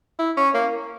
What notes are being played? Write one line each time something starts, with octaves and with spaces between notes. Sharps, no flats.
E4
C#4
A#3